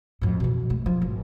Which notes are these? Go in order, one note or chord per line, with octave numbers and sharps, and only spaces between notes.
F2 A2
B2 E3
G#3 A3
F3
G#1